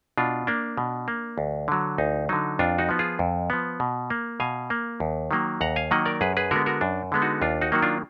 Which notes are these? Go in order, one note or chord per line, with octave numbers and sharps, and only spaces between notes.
B2 D4 F4
A#3 D4
B2
A#3
D2
D3 F#3
D2 D#4
D3 F#3 D#4
F2 D4 F4
D#4 F#4
F3 B3
F4 G#4
F2
F3 B3
B2
A#3
B2 F5 G#5
A#3
D#2
D#3 F#3 A#3
D#2 F#5 A#5
F5 G#5
D#3 F#3 A#3 D#5 F#5
A#4 D5
F#2 G#4 B4
G#4 B4
D3 G#3 B3 F#4 A#4
F#4 A#4
F#2 D4
D3 G#3 B3
D#4 F#4
D#2 D4 F4
D#4 F#4
D#3 F#3 A#3 F#4
D4 F4